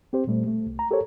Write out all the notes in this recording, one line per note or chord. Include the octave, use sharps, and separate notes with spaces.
C4 G4 C5
A#2 G3 A3
A3
C2
A#5
G4 A4 A#4 C5 C#5